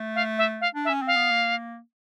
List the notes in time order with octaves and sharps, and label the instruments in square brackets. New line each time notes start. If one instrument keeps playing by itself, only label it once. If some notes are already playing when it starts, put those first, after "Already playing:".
Already playing: [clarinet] A3
[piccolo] F5
E5
F5
[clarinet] D4
[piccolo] E5
[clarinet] C#4
[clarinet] C4 [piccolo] F5
[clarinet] B3
A#3